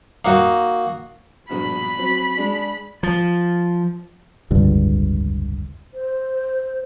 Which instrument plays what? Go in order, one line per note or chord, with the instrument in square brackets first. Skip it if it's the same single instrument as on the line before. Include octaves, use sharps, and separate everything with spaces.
[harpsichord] A#3 D#4 F#4
[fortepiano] A#1 G2 B2 [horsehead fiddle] B5
[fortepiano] F#3 C4 C#4
G#3 D4
[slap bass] F3
[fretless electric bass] F1 C#2 G2 D3
[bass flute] C5